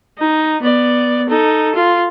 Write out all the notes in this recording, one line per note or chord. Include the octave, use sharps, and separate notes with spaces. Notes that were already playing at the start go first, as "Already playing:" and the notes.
D#4
B3 D5
D#4 A4
F4